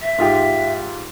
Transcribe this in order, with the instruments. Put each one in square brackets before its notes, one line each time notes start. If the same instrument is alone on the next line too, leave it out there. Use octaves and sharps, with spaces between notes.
[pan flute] E5
[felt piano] G#2 F4 G4